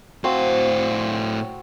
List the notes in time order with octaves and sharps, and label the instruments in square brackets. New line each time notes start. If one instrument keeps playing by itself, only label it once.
[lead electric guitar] A2 F5 [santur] C4 F#4 A5